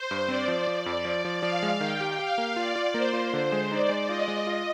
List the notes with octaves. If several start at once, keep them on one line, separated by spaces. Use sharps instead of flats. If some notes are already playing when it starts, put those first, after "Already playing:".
Already playing: C5
G2
C4 D5
F3
F3
F2
F3
F3
F3 F5
G#3
D#3 G5
G4
G4 F5
A#3
F4 D5
F4
A#3 C5
F4
D3 C5
G#3
D#4 D5
G#3
F4 D#5
G#3
F4